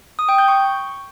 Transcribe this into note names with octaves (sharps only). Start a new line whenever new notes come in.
D#6
G5
G6
C#6